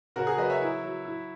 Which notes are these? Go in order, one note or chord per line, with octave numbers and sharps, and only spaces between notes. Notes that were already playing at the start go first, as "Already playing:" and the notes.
C#3 F#4 A#4
G#4
F#3 B4 D#5
C#5 E5
E4
F#3
E4